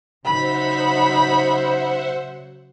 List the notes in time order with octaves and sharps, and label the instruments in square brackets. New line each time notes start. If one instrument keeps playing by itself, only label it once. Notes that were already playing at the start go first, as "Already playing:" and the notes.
[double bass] C#3 F#3 [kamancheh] D#4 B5 [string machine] C5 E5 F#5